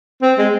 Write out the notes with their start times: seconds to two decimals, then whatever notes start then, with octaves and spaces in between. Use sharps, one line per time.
0.22 C4
0.38 G#3